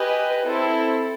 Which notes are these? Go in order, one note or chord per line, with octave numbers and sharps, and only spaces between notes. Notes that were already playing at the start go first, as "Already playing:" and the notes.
Already playing: G4 B4 D#5 G#5
C4 E4 A4